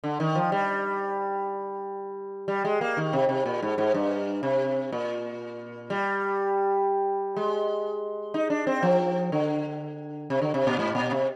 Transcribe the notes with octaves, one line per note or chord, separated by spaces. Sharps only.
D3
D#3
F3
G3
G3
G#3
A#3
D#3
C3
C3
A#2
G#2
G#2
G2
C3
A#2
G3
G#3
D#4
D4
C4
F3
D3
C3
D3
C3
A#2
G#2
A#2
C3